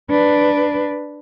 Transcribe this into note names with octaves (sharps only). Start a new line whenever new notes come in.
D4 B4